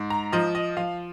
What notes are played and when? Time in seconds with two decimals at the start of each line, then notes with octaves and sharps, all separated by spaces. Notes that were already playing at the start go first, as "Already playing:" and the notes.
Already playing: G#2
0.10 A#5
0.32 F3 D#5
0.55 D#5
0.77 F3 F5